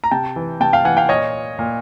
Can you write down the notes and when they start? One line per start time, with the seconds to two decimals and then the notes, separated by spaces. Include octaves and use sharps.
0.04 A#5
0.11 C3 G5 A5
0.36 E3
0.60 C3 G5 A5
0.73 F5 G5
0.85 E3 F#5 G#5
0.97 F5 G5
1.09 A#2 C#5 D#5
1.59 A#2